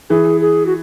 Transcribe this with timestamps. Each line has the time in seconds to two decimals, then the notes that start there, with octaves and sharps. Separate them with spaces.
0.10 E3 G#4
0.41 G#4
0.66 F#4